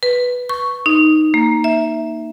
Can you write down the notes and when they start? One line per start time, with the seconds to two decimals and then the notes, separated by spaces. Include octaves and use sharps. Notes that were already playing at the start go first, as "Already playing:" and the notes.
0.03 B4
0.49 C#6
0.86 D#4
1.34 A#3
1.64 E5